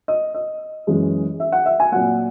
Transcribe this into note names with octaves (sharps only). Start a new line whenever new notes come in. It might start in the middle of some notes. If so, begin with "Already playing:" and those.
D#5
D#5
F#2 E3 G#3
E5
F#5
E5
G#5
A#2 F#3 A#3 F#5